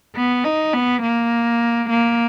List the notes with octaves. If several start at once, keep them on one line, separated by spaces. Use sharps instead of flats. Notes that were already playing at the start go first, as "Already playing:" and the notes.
B3
D#4
B3
A#3
A#3